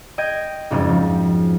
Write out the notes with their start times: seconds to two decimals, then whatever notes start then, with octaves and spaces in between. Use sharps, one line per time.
0.18 D#5 G5 G6 G#6 D7
0.70 F#1 F2 G#2
0.89 F3